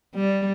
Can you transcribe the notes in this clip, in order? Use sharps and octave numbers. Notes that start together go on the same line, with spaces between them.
G3